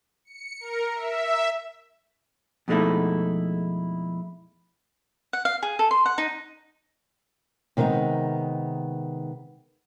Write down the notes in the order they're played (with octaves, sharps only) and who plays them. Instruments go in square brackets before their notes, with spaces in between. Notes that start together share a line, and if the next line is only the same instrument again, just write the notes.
[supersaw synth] C#7
A#4
E5
[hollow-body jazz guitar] F2 B2 G#3 A3 D#4 E4
[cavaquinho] F#5
F5
G#4
A4
C6
F#5
D#4
[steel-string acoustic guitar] C3 D#3 G#3 B3 D#4